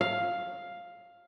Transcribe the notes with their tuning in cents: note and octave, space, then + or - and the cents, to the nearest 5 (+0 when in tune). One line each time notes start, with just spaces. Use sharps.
F5 +5